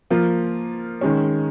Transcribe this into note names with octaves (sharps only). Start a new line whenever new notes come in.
F3 A#3 F4
D#3 G#3 C#4